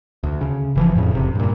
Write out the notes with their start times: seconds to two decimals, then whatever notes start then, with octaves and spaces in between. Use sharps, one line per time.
0.23 D2
0.41 C#3
0.75 F#1 E3 F3
0.95 F2 A2 C#3
1.11 F1 C3
1.35 G2 A#2